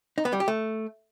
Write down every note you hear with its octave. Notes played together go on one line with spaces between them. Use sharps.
D#4
B3
G3
G4
A3